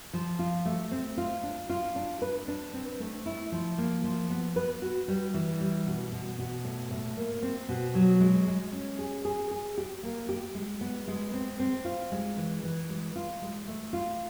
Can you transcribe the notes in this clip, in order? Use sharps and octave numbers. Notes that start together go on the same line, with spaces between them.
F3
F4
A3
C4
F4
D4
F4
D4
B4
D4
C4
A3
E4
F3
A#3
F3
B3
B4
F#4
G3
E3
G3
B2
B2
B2
A2
A2
A#3
C4
B2
F#3
G#3
G#3
C#4
G#4
G#4
G#4
G4
A#3
G4
G#3
B3
G#3
C4
C4
F4
G#3
E3
E3
G#3
F4
G#3
A3
F4